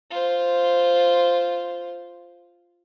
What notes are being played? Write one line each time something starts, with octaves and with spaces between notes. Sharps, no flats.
F4 C5